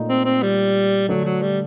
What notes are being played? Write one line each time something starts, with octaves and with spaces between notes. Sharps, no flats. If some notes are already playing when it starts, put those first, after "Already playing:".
Already playing: A#2 A3 D#4
C4
C4
G3
D3 F#3 A3 D4
F#3
G3